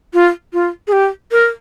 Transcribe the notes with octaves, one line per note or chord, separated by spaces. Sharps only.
F4
F4
G#4
G4
A#4